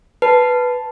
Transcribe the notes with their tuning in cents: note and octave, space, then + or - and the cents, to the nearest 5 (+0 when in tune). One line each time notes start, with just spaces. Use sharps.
B4 +0 A5 +0